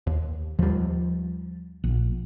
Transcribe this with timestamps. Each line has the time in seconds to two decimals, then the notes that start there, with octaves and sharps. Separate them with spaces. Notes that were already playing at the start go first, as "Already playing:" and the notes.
0.07 D#2
0.59 D#2 F3 G3
1.84 A#1